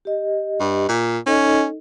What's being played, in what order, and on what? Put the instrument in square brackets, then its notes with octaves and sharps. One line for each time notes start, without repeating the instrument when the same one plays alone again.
[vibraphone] G4 D#5
[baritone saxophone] G2
A#2
[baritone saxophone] C#4 [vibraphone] D#4 A4 D#5